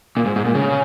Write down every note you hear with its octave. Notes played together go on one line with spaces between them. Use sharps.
A#2
G#2
G#2
A#2
C#3